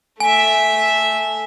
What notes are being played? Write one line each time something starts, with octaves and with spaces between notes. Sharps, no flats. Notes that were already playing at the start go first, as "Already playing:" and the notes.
A3 E5 G#5